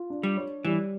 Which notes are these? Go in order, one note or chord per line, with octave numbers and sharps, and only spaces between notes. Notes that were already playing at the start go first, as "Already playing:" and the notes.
Already playing: F4
D4
G3
C#5
E3 G3